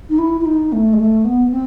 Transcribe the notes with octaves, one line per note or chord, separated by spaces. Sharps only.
D#4
E4
E4
D#4
A3
G#3
A3
B3
B3
C4